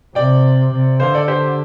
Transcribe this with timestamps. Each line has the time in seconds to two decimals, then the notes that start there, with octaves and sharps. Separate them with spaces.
0.15 C3 D5 G5
0.72 C3
1.00 D3 C5 F5
1.14 A4 D5
1.28 G4 C5